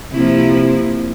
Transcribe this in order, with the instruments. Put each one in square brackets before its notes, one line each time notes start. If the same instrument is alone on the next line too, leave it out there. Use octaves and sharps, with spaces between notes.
[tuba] C3 [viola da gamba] F3 A#3 E4